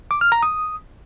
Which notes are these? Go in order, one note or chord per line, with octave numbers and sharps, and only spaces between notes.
D6
F6
A#5
D#6